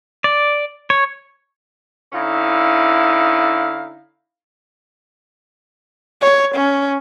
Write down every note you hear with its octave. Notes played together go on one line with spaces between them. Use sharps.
D5
C#5
D3 C#4 D#4 E4 F5
C#5
C#4